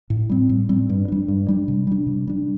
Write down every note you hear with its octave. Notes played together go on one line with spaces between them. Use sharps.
A2
G3 C4
A2
G3 C4
G2
G3 D4
G2
G3 D4
C3
G3 D4
C3
G3 D4